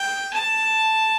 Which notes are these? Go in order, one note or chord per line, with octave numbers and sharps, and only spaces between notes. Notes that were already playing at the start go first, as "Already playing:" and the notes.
Already playing: G5
A5